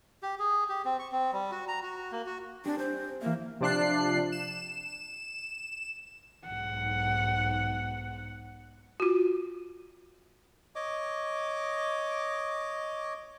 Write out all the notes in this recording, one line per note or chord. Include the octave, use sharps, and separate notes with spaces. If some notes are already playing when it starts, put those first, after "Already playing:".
G4
G#4
G4
C4
C#6
C4
G3
F#4
A#5
F#4
A#3
F#4
C4 D4 G4 G#4
C5
E3 A#3 A#4 E5
C3 F3 D4 F#6 C7
E7
B1 G#2 F#5
F4 F#4
C#5 D#5 D6